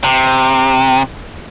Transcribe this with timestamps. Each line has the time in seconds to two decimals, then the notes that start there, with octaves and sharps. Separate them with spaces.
0.04 C3